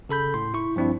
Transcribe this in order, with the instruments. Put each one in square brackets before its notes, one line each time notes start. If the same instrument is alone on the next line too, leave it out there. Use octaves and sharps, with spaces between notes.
[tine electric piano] C#3 A4 B5 G6
A2 C6
E4 C#6
G2 F3 C4 D4 E4